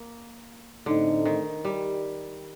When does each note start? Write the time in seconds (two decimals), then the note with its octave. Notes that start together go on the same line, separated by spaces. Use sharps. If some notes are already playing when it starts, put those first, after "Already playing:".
Already playing: A#3
0.86 A2 D3 A3 C4 D#4
1.25 D#3
1.65 G3